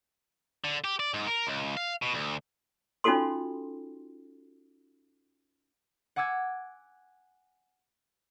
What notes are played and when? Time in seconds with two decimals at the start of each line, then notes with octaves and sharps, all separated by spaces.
0.64 D3
0.84 G4
0.99 D5
1.14 G#2
1.27 A#4
1.47 C#2
1.77 F5
2.02 B2
2.14 D2
3.04 C#4 D#4 F4 F#4 A4 C6
6.16 F#5 G#5 D6 E6 G#6